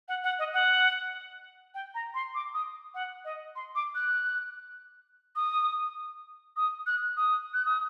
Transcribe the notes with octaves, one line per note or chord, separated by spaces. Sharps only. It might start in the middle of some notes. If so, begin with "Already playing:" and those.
F#5
F#5
D#5
F#5
G5
A#5
C6
D6
D#6
F#5
D#5
C6
D6
F#6
D#6
D#6
F#6
D#6
F#6
D#6